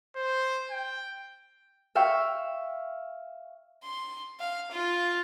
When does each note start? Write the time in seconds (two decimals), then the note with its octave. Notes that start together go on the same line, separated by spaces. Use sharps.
0.17 C5
0.71 G5
1.95 E5 F5 G5 C#6
3.84 C6
4.40 F5
4.71 F4